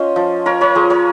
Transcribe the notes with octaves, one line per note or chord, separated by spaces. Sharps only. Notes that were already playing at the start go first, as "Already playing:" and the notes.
Already playing: C#4 F4 C5 D#5
F3
F4 A#4 C#5
A#4 C#5
F3 G#4 C5
A#4 C#5